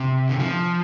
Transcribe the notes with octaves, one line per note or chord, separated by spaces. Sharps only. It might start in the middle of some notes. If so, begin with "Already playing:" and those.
Already playing: C3
D3
F3